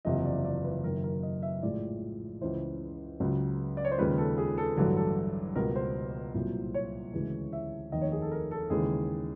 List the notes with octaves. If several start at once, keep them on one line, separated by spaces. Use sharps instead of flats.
F#1 E2 C3 F3 D#5
D5
D5
B4
F#1 F#2 D#3 A#4
A#4
D#5
E5
A#1 A2 F3 G#3 D5
C#2 C#3 E3 C5
C#2 C#3 F#3
D5
C#5
C5
D#2 C#3 F3 G#3 B4
A4
G#4
A4
A1 G2 D3 F#3 A4
A4
C#2 B2 G3 A#4
C5
C2 A#2 F#3
C#5
D2 C#3 E3 G#3
E5
F1 D#2 D#3 D#5
C#5
G#4
A4
A#4
A4
D#2 C#3 E3 G#3 G#4